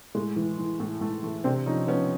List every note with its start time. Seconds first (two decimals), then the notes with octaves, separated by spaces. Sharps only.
0.15 A2 G#3
0.36 E3
0.58 E3
0.80 A2 A3
1.01 A2 A3
1.23 E3 A3
1.44 C3 C4 D4
1.66 F3 C#4 D#4
1.88 F3 B3 C#4